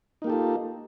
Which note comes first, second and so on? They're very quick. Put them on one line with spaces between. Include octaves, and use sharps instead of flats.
D#4 A#3 G4 A4 F4